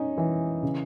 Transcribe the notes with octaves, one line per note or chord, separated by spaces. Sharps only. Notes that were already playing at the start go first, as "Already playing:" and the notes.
Already playing: C#4 D#4
E3
C#3